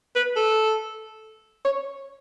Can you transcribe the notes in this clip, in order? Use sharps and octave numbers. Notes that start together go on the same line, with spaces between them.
B4
A4
C#5